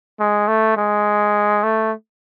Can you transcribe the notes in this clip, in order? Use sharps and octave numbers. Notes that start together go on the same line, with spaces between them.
G#3
A3
G#3
A3